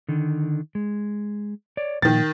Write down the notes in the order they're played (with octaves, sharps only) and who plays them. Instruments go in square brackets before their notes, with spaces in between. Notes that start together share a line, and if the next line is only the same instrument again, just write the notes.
[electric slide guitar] D3 D#3
G#3
C#5 D5
[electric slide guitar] A#2 F3 [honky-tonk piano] D#3 A6